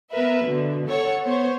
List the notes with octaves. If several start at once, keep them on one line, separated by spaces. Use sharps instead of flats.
B3 A#4 B4 E5
B2 D3
A4 C#5 F#5
B3 C5 C#5